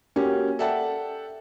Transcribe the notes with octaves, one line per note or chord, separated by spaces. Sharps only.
A#3 C#4 F#4 G4
A4 D5 E5 F#5 G5 A5